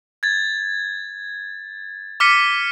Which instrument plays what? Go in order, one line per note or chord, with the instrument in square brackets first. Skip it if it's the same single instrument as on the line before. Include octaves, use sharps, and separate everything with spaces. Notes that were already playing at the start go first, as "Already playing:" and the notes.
[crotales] G#6 A6
D6 F6 B6 C#7 D#7